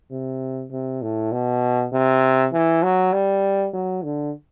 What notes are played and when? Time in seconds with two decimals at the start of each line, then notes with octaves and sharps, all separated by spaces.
0.11 C3
0.72 C3
1.02 A2
1.32 B2
1.93 C3
2.53 E3
2.83 F#3
3.13 G3
3.73 F#3
4.04 D3